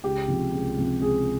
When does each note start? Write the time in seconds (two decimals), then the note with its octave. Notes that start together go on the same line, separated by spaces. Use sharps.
0.04 C#2 G4
0.28 C3 F3
0.53 C#2
0.78 C3 F3
1.01 C#2 G#4